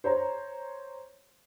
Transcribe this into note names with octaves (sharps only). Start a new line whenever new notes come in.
C5 C#5 A#5